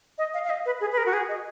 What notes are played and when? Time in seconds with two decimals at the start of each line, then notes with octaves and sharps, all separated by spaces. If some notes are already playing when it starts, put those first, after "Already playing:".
0.18 D#5
0.34 F5
0.45 F5
0.50 D#5
0.66 B4
0.81 G#4
0.92 B4
0.98 A#4
1.06 F#4
1.13 G#4
1.29 D#5